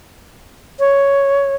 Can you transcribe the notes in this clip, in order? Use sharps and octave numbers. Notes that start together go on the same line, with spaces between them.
C#5